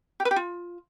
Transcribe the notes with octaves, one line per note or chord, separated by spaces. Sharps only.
G4
B4
G4
F4